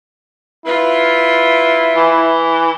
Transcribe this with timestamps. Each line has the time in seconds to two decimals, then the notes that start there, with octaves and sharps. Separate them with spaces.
0.66 E4 F4 B4
1.96 E3